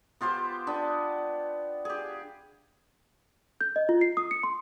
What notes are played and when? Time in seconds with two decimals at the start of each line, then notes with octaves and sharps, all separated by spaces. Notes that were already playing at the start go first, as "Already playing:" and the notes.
0.21 B3 F4 G4 C5
0.67 B3 D4
1.85 G4 G#4
3.61 G6
3.76 D#5
3.89 F4
4.01 C7
4.17 D#6
4.31 C#7
4.43 C6